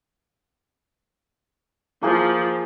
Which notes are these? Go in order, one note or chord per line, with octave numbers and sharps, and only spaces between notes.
F3 A#3 G#4